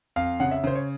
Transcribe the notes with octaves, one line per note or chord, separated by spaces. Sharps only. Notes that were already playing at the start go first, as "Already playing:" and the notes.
F2 F5
C#3 F#5
E5
C#3 C5
C#5